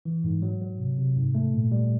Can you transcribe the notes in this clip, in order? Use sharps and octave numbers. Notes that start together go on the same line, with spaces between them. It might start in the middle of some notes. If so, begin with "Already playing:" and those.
E3
G#2
F#3
F#3
C3
C3
G#2
A3
A#2
G3